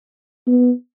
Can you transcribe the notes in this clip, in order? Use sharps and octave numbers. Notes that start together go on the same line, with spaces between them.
B3